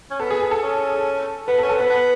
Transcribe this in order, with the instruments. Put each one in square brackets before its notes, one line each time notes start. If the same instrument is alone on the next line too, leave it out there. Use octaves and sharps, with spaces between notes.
[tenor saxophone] C#4
[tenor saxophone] B3 [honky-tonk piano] A4
[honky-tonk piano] G#4
G#4
A4
[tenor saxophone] C#4
[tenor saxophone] B3 [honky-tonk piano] B4
[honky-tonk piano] A4
[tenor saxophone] C#4
[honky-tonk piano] A4
[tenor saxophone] B3 [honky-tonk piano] B4
[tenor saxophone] B3